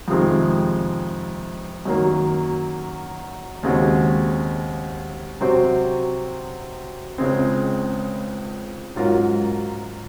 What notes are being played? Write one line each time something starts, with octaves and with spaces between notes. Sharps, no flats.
F2 C3 D#3 G#3 C4
F#2 D#3 F#3 A#3
D#2 C#3 G#3 C4 F#4
C3 F#3 C4 F#4 C5
C#2 C#3 G#3 C4
G#2 F#3 C#4 F4 A#4